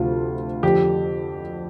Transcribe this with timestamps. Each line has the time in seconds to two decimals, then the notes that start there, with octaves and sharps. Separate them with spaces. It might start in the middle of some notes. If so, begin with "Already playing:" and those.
Already playing: D2 C3 F3 F4
0.63 F2 D3 F3 G4